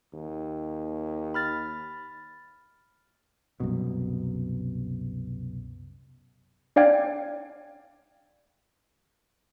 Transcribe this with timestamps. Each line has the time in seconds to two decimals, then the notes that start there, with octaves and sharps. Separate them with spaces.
0.13 D#2
1.34 B5 F6 A6
3.60 C2 F#2 B2
6.76 D4 D5 F5 G5 G#6